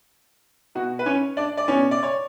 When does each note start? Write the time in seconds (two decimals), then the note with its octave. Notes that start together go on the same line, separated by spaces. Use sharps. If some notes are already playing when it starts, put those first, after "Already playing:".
0.75 B2 F#4
0.99 B4
1.06 C#4 C#5
1.37 D4 D5
1.57 D5
1.68 B2 C#4 C#5
1.91 D5
2.03 C#5